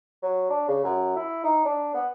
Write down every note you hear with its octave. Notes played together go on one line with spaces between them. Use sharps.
F#3
D4
C#3
F#2
E4
D#4
D4
B3